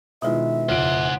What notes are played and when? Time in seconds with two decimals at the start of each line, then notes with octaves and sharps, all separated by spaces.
0.22 B2 D#3 G#3 B3 E4 F4 E5
0.69 F1 C#3 F4 C5 F#5 D7